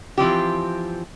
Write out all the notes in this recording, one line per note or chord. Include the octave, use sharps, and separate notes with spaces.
E3 F3 C4 G4